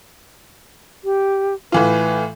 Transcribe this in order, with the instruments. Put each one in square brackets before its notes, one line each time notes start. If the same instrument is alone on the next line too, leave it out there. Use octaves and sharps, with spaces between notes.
[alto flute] G4
[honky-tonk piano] A2 E3 F4 [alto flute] B4